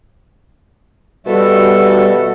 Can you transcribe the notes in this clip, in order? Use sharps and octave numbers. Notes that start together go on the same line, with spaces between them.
B2 G3 F#4 A4 E5